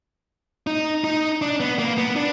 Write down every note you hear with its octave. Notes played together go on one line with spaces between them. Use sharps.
D#4
D#4
D4
B3
A#3
B3
D4